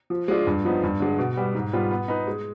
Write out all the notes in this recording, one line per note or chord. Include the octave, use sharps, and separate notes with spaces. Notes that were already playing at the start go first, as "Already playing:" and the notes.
F3
G#3 D4 F4
G2
F3 B3 D#4
G2
D3 G#3
B2
G3 B3
G#2
G3 B3 F4
B3
D#4 B4
G#3